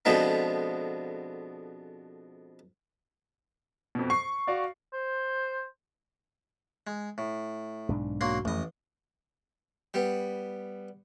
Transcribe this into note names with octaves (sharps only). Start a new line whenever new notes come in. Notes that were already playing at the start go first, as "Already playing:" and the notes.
F2 B2 D3 F3 G#3 B3
F2 B2
C#6 C7
F#4 D5 F5
C5
G#3
A2
B1 G#2 D4
F#3 A#3 C6
A1 F2 A3 D#5
G3 B3